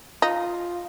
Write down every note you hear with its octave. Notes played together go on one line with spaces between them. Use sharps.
D#4 F4